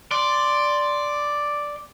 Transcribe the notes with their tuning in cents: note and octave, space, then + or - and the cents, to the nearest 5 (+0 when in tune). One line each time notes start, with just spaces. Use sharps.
D5 +0 C6 +0